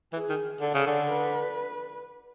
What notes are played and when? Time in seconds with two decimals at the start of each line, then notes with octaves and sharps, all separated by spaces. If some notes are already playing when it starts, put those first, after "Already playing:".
0.13 E3 G#4
0.30 D#3
0.61 D3 A4
0.74 C#3
0.87 D3
1.10 B4